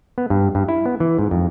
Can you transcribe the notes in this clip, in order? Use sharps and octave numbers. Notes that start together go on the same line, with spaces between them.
B3
G2
G2
E4
B3
E3
G#2
F2